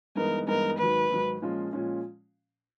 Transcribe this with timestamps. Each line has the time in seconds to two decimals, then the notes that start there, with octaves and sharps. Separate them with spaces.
0.15 G2 E3 G#3 B3 D#4 A#4
0.47 G2 E3 G#3 B3 D#4 A#4
0.78 G#2 D#3 F#3 B4
1.10 G#2 D#3 F#3
1.42 A#2 F3 G#3 C#4 F4
1.73 A#2 F3 G#3 C#4 F4